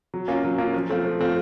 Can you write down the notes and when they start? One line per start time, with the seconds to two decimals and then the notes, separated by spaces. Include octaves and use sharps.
0.14 F#3
0.28 A#3 C#4 F4
0.44 F#3
0.58 A#3 C#4 F4
0.73 F3
0.89 A3 C4 F4
1.04 F3
1.19 A3 C4 F4